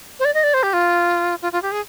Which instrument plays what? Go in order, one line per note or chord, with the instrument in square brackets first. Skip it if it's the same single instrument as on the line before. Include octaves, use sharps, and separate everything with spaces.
[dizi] C5
D5
D#5
D5
C5
G4
F4
F4
F4
G4
G#4